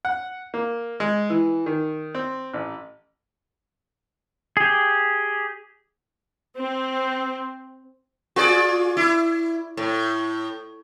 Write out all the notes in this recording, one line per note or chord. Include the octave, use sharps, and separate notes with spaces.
F#5
A#3
G#3
E3
D#3
C4
A1
G4 G#4
C4
F4 G#4 D5
E4
A2